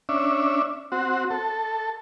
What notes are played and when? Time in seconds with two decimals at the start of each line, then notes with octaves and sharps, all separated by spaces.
0.09 C#4 D4 E5
0.92 C4 F#4
1.30 A4